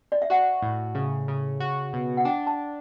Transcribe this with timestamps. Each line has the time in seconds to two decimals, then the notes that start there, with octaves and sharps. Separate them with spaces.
0.12 D5
0.22 E5
0.30 F#4 F#5
0.62 A2
0.95 C#3
1.28 C#3
1.60 F#4
1.93 B2
2.17 F#5
2.25 D4 G5
2.47 A5